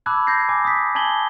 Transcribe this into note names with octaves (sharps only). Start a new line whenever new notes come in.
A5 B5 D6 E6 F#6 G#6
G6 G#6 A#6 C7
G#5 D6
D#6 B6
G#5 A5 G#6 F#7 G7